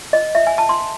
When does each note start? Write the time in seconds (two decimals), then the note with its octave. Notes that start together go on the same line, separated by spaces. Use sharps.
0.13 D#5
0.35 E5
0.47 G#5
0.58 A5
0.69 C6